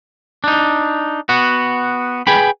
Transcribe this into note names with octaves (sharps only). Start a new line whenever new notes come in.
D4 D#4
B3 F#4
G#4 B4 G5 B5